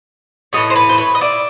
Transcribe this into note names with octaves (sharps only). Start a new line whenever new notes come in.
A2 E3 A3 C#5 D#5
C5
B4 C#5
C5
B4 C#5
D#5
D5 E5